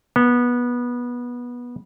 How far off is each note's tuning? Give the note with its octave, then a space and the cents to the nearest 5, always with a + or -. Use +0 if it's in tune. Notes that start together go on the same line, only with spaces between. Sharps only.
B3 -20